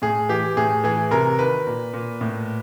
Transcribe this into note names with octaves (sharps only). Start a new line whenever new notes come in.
A2 G#4
E3 G4
A2 G#4
E3 G#4
C3 A#4
D#3 B4
A#2
A#2
A2